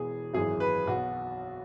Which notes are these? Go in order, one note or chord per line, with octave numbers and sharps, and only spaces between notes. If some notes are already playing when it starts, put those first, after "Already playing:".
Already playing: E1 E2 E3 G#4
G#1 F#2 E3 G#4
B4
B1 B2 F#4